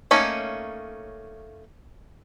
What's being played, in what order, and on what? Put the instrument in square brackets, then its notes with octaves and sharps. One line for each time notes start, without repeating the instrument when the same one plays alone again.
[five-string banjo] A3 A#3 C#4 D#4 C#5